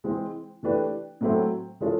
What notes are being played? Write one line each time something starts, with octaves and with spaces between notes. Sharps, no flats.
E3 G#3 C4
E3 A3 D4 G4 B4
A2 F#3 A3 C4 E4
E3 G#3 C#4 F4 A4